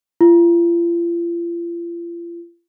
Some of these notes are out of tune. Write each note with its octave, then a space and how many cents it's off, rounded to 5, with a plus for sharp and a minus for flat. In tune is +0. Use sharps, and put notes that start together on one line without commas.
F4 -40